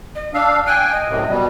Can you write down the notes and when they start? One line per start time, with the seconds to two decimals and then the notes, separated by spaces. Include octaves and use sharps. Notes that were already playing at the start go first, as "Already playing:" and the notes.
0.15 D#5
0.34 D4 F5 E6
0.67 G5 G#5 F#6
0.92 D#5
1.08 F#2 A2 C3
1.28 B2 G3